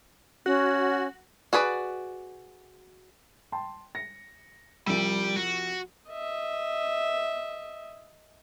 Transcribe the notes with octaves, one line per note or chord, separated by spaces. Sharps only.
C#4 F#4
F#4 G#4 B4 D5
G5 A5 C6
A#6 C#7
C2 F3 G3 D5 E6
F#4
D#5 E5